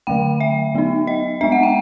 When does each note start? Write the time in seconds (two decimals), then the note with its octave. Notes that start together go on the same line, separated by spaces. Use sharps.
0.07 D3 F#3 A3 G5
0.40 E5
0.75 F#3 B3 D#4
1.07 D#5
1.41 G#3 B3 D4 E5
1.52 F#5
1.63 G5